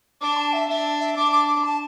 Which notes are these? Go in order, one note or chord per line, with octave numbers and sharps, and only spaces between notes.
D4 D6
A5
E5
D4 E5
E5
D4 D6
D6
D6
A5